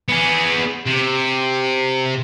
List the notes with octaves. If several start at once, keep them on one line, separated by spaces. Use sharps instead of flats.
B3 G#4
C3